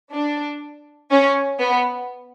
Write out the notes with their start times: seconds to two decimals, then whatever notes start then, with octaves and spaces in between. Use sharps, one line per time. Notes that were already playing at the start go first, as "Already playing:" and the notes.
0.12 D4
1.10 C#4
1.60 B3